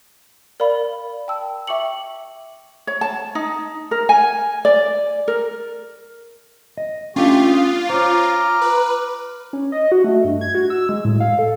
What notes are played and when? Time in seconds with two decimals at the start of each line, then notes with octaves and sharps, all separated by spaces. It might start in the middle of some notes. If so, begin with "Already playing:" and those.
0.60 A#4 D5 F5 B5
1.28 G5 A5 E6
1.67 E5 G5 C#6 D6 C#7 F#7
2.87 C#5
3.01 A5
3.35 D#4
3.91 A#4
4.09 G#5
4.65 D5
5.28 A#4
6.78 D#5
7.16 A3 C#4 D4 F4 G4 C#6
7.47 B3
7.90 C5 C#5 A#5 D6 F6
8.62 B4
9.53 C#4
9.72 D#5
9.92 F#4
10.04 A3
10.24 G2
10.41 G#6
10.55 F#4
10.70 E6
10.89 G#3
11.05 A2
11.20 F5
11.39 A4